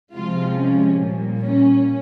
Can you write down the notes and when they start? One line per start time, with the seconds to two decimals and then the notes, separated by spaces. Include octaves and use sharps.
0.14 C3 F3 G#3 F4
0.56 C#4
0.98 A#2 G3
1.40 C#4